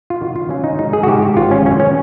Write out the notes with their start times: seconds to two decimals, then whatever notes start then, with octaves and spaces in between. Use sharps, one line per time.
0.10 F4
0.21 D#3 F#4
0.36 F4
0.49 F#3 C#4
0.64 D#4
0.79 G#2 D#4
0.93 G#4
1.03 F#4
1.07 G#2 G4
1.22 G4
1.37 G#1 F4
1.51 C#4
1.66 F#2 C#4
1.80 C#4